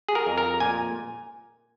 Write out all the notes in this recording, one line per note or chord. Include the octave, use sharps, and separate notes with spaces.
G#4
A#4
F2
A#4
A#2 G#5